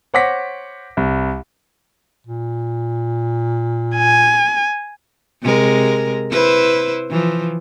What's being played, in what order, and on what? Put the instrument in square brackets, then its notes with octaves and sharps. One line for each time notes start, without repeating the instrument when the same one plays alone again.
[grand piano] C5 C#5 F#5 D6 A#6 B6
C2
[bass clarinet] A#2
[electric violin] G#5
[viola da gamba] C3 G#3 A#4
E4 B4 C5
E3 F3